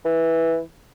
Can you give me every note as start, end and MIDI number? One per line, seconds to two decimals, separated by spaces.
0.05 0.60 52